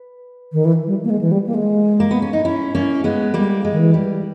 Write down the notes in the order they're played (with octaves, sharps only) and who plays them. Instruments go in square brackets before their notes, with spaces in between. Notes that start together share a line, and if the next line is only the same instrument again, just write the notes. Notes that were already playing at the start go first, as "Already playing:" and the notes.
Already playing: [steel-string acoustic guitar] B4
[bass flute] D#3
E3
G3
A#3
G#3
E3
G3
A#3
G#3
[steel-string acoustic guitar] A#3
B3
C#4
D#4
C#4 E4
A#3 C#4
G#3 B3
[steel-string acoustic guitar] G3 A#3 [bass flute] G#3
[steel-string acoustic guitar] G#3
[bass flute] D#3
E3
[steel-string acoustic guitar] G3